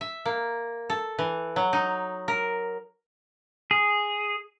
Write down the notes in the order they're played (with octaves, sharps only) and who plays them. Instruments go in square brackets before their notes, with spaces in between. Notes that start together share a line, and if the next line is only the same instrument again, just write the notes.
[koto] E5
A#3
A4
E3
F#3
D#4
A#4
[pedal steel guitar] G#4